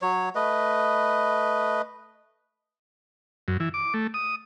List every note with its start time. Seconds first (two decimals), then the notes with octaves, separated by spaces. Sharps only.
0.02 F#3 C#5
0.35 A3 B4 D#5
3.48 F#2
3.60 E3
3.74 D6
3.94 A3
4.14 D#6